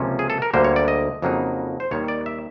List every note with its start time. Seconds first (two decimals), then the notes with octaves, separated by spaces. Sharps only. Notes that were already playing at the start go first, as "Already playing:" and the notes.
Already playing: C#2 C3 F3 A#3 C#4
0.19 G#4
0.30 A4
0.42 A#4
0.54 D2 D3 G3 A#3 C5
0.65 C#5
0.76 D5
0.88 D#5
1.22 F2 C#3 F#3 A#3 D#4
1.80 C5
1.91 D#2 D#3 G3 C#5
2.08 D5
2.26 E5